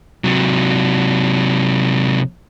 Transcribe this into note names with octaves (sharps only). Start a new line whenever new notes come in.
C3 F#3